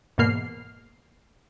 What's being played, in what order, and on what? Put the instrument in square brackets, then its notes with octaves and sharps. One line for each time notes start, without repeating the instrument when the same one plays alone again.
[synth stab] E2 G#2 B2 A#3 F6 C7